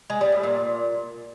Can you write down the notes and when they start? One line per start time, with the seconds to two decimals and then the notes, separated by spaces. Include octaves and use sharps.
0.10 G#3
0.21 G3
0.32 A2
0.43 A#2